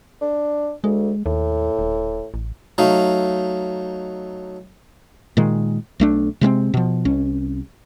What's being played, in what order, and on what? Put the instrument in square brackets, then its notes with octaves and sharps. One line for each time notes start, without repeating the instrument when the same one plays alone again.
[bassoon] D4
[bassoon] D2 [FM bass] G#3
[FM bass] D#2 [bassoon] A2
[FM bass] D#1
A1
[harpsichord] F#3 A3 D#4 F5
[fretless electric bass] A#2 D#3 G#3
B1 A3 D4
C3 G#3 A#3 C4
B2 F3
C2 C#4